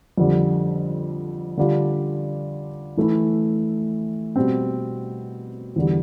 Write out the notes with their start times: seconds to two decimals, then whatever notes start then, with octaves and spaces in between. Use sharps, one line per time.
0.17 F2 D3 G3
1.57 D3 G3 D4 F4
2.97 E3 A3 E4
4.36 B2 G3 C4
5.76 E2 D3 G3